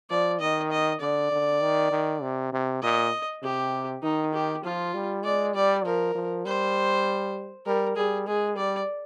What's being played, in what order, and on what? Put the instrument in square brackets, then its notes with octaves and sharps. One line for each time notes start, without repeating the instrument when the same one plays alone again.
[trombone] F3 [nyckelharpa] D5
[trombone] D#3 [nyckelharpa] D#5
[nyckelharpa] D#5
[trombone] D3 [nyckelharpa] D5
[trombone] D3
D#3
D#3
C3
C3
[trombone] A#2 [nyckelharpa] D#5
[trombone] C3 [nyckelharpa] G4
[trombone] D#3 [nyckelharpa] D#4
[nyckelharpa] G4
[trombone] F3 [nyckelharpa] F4
[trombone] G3
[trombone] G#3 [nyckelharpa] D5
[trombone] G3 [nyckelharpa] D5
[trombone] F3 [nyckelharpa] A#4
[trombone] F3
[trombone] G3 [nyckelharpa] C5
[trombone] G3 [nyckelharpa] A#4
[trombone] G3 [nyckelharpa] G#4
[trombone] G#3 [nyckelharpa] G#4
[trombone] G3 [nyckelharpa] D5